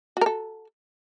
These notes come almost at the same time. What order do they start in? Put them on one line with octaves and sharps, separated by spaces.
F#4 A#4 A4